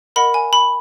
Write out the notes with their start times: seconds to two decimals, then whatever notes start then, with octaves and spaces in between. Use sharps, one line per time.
0.16 A#4 D#5 F#5 B5
0.34 G#5
0.53 B5